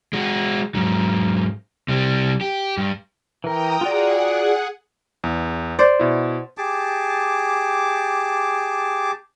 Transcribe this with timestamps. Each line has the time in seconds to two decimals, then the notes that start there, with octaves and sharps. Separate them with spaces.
0.13 G#3 F#4
0.75 G#2 F#3
1.88 C3 G3
2.41 G4
2.78 G2
3.44 E3 A#4 G5 A#5 D#6
3.81 F4 F#4 G#4 D5 F#5
5.24 E2
5.79 C5 D5
6.00 B2 E4
6.58 G4 G#4 A5 D6